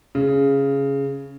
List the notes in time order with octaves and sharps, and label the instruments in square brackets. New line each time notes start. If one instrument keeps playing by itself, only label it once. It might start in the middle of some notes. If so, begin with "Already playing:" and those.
[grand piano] C#3